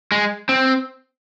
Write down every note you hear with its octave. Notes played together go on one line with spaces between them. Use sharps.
G#3
C4